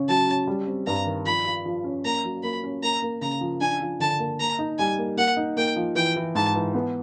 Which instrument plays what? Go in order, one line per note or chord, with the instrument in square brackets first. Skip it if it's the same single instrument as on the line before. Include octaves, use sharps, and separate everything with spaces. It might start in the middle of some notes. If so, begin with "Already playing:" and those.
Already playing: [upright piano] C#3 C#4
[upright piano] F#3 [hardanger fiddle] A5
[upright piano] C#4
G3
C4
[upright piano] G2 [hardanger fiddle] A#5
[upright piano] D#3
[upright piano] F3 [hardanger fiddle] B5
[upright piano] F4
F3
C#4
[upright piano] A#3 [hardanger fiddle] A#5
[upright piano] F#3
[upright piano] A#3 [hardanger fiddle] B5
[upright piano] C#4
[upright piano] A#3 [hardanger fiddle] A#5
[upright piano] A#3
[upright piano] C#3 [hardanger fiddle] A#5
[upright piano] F3
[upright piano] D4 [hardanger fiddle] G#5
[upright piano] F3
[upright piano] D3 [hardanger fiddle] A5
[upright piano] A#3
[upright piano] A#3 [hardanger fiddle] A#5
[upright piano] D#4
[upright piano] G3 [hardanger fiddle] G#5
[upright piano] A#3
[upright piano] A#3 [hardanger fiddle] F#5
[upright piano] D#4
[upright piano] A#3 [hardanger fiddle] G5
[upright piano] F3
[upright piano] E3 [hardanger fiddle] G5
[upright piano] E3
[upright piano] G#2 [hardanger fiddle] A5
[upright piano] E3
B3